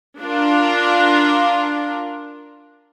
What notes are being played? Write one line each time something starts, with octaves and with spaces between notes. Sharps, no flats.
D4 F4 A#4